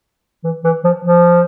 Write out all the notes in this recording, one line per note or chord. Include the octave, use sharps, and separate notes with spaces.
E3
E3
F3
F3